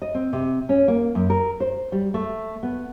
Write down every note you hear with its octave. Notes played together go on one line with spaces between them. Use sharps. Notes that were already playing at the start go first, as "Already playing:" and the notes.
D#5
C4
C3
C#4
A#3
F#2
A#4
C5
G3
A3
B3